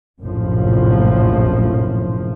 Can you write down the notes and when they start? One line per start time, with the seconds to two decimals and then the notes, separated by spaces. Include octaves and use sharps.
0.20 F1 A#1 F#2 A2 F3